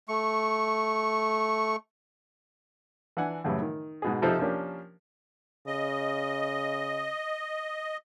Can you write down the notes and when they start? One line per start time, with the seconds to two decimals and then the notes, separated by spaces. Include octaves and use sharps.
0.08 A3 C#6
3.17 E3 D4 F#5 G#5
3.44 F#2 A2 C#3 E3 G3
3.62 D#3
4.02 G#2 B2 G#4
4.22 C3 F3 D#4 A4 C5
4.39 F3 A#3 C#4 D4 G4
5.67 C#3 D#5